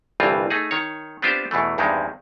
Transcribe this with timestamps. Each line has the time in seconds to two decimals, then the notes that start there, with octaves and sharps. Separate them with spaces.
0.20 G1 C2 G2 E3 C4 F4
0.50 A3 D#4 G#4
0.71 D#3 C#5
1.22 B3 C4 D4 F4 G4 C5
1.51 E2 B2 E3 A3
1.78 E2 G2 D#3 G3 G#3 C4